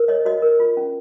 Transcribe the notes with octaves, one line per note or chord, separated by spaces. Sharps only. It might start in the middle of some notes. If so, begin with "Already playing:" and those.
Already playing: A#4
C#5 D#5
F#4 D#5
A#4
F4
C#4